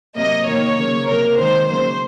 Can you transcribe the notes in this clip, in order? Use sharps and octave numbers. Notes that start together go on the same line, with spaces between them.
C3 F#3 A#3 D#5
D#3 A#3 C#5
C#3 F#3 A#3
C3 F#3 A#3 A#4
D#3 G#3 C5
C#3 F#3 A#3 C5